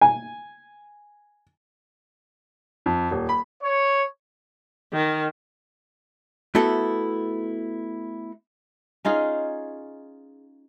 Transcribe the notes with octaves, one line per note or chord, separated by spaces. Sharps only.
G#5
F2
D#1
B5
C#5
D#3
A3 B3 E4 F#4 A4
C#4 D#4 F4 G#4